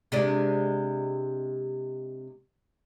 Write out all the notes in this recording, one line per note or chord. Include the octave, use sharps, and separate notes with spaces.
C3 G#3 D4